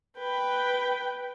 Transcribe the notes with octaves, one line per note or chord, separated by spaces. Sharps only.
B4 G5